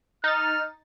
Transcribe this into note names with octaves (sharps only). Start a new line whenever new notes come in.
D#4 F6 A6